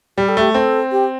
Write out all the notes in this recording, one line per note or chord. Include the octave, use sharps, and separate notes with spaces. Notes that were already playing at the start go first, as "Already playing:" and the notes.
G3 G4
A4
A3 G4
C4 A4
G4